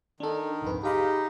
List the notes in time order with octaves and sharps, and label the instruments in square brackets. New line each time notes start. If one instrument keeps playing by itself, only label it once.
[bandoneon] D#3 [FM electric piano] D4 A4
[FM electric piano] C2 F2 B4 [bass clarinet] G#2
[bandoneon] D#4 [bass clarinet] G4 [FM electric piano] G#4 F5 B5